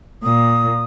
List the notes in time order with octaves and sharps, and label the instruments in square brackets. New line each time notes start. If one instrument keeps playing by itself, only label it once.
[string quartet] A#2 [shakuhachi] D#6